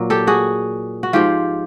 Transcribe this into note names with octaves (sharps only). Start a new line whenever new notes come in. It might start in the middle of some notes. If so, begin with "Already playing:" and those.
Already playing: A#2 F#3
G4 A4
F#4 G#4
F#4
G#2 F3 F4 G4